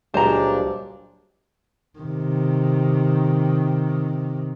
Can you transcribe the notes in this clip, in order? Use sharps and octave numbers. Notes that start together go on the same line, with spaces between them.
C#2 A#2 F#3 G3 D4 C5 A#5
C3 D#3